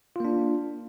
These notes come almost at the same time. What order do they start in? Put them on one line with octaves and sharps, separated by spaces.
F4 A#3 D4